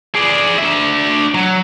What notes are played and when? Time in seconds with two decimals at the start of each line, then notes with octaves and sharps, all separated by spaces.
0.15 G#4 D5
0.58 D4 E5
1.34 F#3